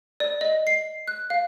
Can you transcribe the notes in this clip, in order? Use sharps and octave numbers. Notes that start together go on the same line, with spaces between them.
D5
D#5
C7
F#6
F5